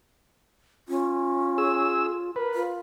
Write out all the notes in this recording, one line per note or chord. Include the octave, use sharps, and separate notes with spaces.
C#4 F4
G#4 E6
A#4 B4
F4